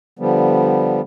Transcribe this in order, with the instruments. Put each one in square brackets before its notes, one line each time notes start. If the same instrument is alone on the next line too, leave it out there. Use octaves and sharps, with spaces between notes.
[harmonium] D3 F3 G3 B3